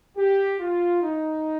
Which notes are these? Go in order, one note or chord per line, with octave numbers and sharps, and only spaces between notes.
G4
F4
D#4